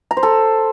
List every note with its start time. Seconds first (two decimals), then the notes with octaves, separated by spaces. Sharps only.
0.11 A#5
0.17 C5
0.23 A4